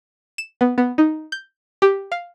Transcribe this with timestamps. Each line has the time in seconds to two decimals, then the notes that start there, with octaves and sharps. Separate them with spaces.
0.38 E7
0.61 B3
0.78 B3
0.98 D#4
1.32 G6
1.82 G4
2.12 F5